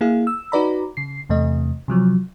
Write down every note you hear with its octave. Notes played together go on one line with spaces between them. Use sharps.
A#3 E4 G#4 F5
E6
D#4 F#4 B4 D5 A#5 B5
C#3 C7
E2 C3 A3 D#5
C3 F3 F#3